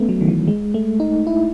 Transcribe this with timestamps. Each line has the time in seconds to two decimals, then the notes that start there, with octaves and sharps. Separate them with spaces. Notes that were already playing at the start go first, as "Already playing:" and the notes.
Already playing: A3 B3 C#4
0.09 F#3
0.21 D#3
0.27 E3
0.47 G#3
0.74 A3
1.00 D#4
1.27 E4